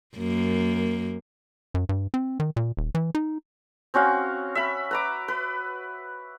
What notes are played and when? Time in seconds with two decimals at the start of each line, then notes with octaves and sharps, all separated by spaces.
0.17 F#2 A#3
1.74 F#2
1.89 G2
2.14 C4
2.40 D#3
2.56 A#2
2.77 D#1
2.95 E3
3.15 D#4
3.94 C4 C#4 F#4 F5
4.55 E5 B5
4.91 B4 A#5 D6
5.28 B4